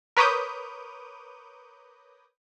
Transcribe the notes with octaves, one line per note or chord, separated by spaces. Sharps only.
A#4 B4 C#5 D6 D#6 G6